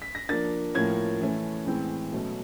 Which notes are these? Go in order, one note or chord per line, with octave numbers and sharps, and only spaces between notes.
B6
A#6
F3 A#3 D4 A6
A2 F3 A#3 C#4 G#6
E3 A3 C#4
A2 E3 G#3 C4
B2 F#3 A3 C#4